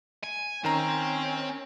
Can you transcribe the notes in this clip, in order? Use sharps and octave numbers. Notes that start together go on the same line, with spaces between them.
G#5
D#3 C4 C#4 A#5